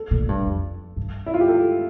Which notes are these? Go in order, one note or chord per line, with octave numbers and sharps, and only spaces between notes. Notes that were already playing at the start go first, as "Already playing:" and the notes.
Already playing: A4
A#2
G2
F2
G2
E4
F4
G4
A4